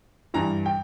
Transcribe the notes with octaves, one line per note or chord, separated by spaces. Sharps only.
G2 E3 A#5
G5